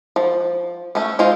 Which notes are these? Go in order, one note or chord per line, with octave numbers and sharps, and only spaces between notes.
F3
A3 C#4
G#3 F4 C5